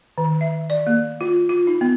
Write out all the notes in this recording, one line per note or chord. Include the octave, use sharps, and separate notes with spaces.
D#3
E5
D5
A#3
F4
F4
D#4
B3